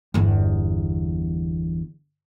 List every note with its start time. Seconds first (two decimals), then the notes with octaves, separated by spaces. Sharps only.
0.14 G1 E2